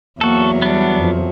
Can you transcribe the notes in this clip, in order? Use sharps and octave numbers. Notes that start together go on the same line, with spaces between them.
E2 F#3 A#3 F#4 A4
G3 B3 D4
F2 F3